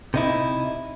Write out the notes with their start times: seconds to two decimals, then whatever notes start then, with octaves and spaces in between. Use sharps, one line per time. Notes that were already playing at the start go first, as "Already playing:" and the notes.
0.14 C3 D#4 E4